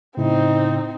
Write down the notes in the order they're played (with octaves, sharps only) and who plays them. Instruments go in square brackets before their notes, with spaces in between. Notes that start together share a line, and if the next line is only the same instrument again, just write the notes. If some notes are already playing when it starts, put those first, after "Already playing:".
[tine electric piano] A2 C#3 E4 [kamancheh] C4 D#4